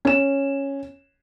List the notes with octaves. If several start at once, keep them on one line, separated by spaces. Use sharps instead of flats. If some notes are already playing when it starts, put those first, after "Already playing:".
C#4 E7